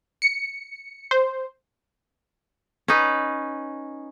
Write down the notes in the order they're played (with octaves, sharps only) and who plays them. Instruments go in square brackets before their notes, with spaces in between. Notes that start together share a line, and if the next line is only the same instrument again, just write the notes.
[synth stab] C#7
C5
[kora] C#4 D#4 B4